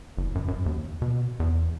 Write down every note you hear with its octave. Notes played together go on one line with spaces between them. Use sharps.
F#1
F#2
F#2
D#2
B2
E2